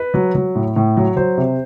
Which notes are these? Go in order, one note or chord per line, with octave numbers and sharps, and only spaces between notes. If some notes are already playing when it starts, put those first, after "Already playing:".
Already playing: B4
F#3
F#3
A2
A2
F#3
F#3 C5
C3